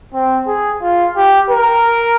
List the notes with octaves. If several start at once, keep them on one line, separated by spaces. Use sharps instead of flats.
C4
G#4
F4
G4
A#4